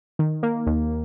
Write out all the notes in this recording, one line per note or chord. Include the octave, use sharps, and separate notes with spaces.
D#3
A#3
D#2